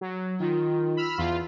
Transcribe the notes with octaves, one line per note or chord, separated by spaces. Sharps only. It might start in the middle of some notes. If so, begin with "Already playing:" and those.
F#3
D#3 F4
B5 E6 F6
E2 F4